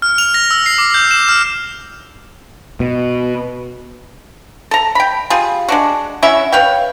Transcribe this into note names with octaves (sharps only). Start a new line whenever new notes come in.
F6
F7
A#6
E6
C7
D6
G6
E7
F6
B2
A4 A#5
G5 B5
G3 F4 G#4
G#3 D4 F#4
C#4 E4 F#4 E5
B4 C#5 F5 G5